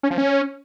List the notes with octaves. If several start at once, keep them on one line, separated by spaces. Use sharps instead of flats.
C#4
F3
C#4